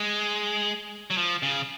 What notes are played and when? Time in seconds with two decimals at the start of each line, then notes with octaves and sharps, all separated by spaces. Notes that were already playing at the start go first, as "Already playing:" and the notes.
Already playing: G#3
1.10 F#3
1.17 F3
1.43 C#3